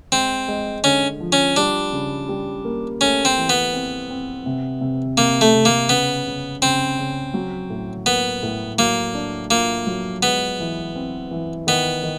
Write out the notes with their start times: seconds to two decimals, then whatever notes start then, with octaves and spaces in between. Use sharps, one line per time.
0.12 G#3 C4
0.48 G#3
0.84 D3 C#4
1.20 F3
1.32 C#4
1.56 G3 D4
1.92 C#3
2.29 G3
2.65 A#3
3.01 A3 C#4
3.25 C4
3.37 E3
3.49 B3
3.73 C4
4.10 C4
4.46 C3
4.81 C3
5.17 C3 A#3
5.41 A3
5.54 C3
5.65 A#3
5.89 C#3 B3
6.26 C#3
6.62 C#3 C4
6.99 C#3
7.34 F#3
7.70 A2
8.06 A#3 B3
8.43 A2
8.79 F#3 A#3
9.15 D4
9.51 A#3 F4
9.87 F#3
10.23 G#3 B3
10.60 E3
10.96 C4
11.31 E3
11.67 D#3 B3
12.03 D#3